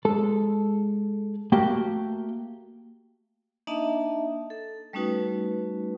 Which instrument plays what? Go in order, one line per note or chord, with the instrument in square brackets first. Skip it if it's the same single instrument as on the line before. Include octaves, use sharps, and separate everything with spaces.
[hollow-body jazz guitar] G#3 A4
A3 A#3 F#4 G4 G5
[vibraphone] A#3 D4 D#4 D#5 E5 A5
A4
G3 A3 C#4 D#4 F#4 B4